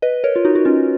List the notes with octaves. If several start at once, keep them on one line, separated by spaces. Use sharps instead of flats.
B4 D#5
A#4 C#5
F4
D#4 F#4
F#4
C#4 F4